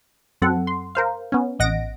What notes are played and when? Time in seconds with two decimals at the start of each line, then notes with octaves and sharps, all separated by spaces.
0.42 F#2 F#3 C4 A4 F#5
0.67 C6
0.95 A#4 C5 F5
1.32 B3 C#4
1.59 A1 D#5 F#5 A#6 D7